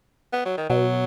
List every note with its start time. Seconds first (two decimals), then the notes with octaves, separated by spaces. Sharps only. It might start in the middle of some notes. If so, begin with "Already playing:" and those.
0.33 B3
0.45 F#3
0.58 D#3
0.70 B2 F#3